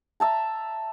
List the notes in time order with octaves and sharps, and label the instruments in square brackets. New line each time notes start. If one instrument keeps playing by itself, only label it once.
[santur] E5 A5 A#5